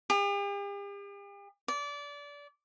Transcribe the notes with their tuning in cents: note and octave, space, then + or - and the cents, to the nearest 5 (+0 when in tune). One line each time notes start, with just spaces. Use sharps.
G4 +45
D5 -25